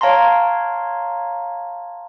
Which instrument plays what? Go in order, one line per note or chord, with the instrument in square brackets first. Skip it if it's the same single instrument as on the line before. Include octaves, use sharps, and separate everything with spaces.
[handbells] C#5 F5 A5 A#5 C6